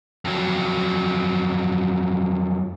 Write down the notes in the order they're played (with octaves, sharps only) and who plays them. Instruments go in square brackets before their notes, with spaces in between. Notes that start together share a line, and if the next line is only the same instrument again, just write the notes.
[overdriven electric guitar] F2 F#3